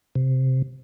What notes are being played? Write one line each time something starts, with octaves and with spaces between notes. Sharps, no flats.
C3